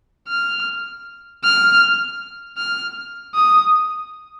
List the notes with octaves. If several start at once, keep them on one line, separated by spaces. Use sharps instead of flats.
F6
F6
F6
D#6